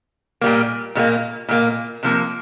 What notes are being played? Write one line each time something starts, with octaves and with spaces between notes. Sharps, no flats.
A#2 G3 A#3
A#2 G3 A#3
A#2 G3 A#3
C3 F3 A#3